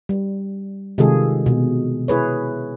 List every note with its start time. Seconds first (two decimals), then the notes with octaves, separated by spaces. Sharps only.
0.09 G3
0.98 C3 D#3 G#3 F4 G#4 A4
1.46 B2
2.08 E4 G#4 B4 C#5